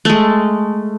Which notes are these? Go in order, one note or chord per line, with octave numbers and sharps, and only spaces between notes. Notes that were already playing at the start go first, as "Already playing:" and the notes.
G#3 A3